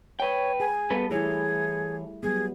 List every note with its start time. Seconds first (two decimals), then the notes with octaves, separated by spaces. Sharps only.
0.20 B4 C#5 G5
0.60 G#4 G#5
0.90 G3 B3 A4 B4
1.11 E3 A3 E4 G#4 C#5
2.23 F#3 G3 B3 G#4